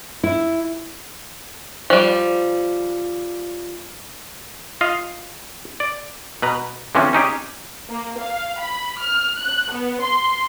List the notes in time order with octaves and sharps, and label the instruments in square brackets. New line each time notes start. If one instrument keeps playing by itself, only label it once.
[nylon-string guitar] E4
[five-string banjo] F3 G3
[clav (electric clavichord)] F4 D#5 F5
D5
B2 B4 A#5
D3 E3 F3 C4 C#4
C#4 D#4 G4 G#4
[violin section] A#3
F5
B5
F6
F#6
B3
C6